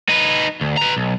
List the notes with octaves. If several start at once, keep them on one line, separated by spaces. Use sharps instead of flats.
D#4 B4
D2
B4 A#5
B1